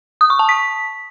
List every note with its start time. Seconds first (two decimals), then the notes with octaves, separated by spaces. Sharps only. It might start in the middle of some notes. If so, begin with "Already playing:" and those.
0.21 D#6
0.30 C#6
0.39 A5
0.49 B6